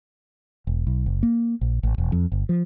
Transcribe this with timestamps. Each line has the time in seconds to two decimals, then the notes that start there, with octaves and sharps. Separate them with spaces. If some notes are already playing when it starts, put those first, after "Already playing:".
0.67 E1
0.87 B1
1.06 F#1
1.23 A#3
1.61 A#1
1.83 A1
1.98 E1
2.12 F2
2.32 G1
2.49 F3